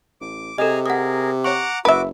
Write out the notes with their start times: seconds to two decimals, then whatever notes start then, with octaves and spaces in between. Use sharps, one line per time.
0.21 A1 D6
0.58 C3 G#4 A4 D#5 G#5 A#5
0.86 G#4 A#4 F#5 D#6
1.44 C#5 F#5 A#5 C#6 D6
1.85 F#1 F#4 B4 E5 D6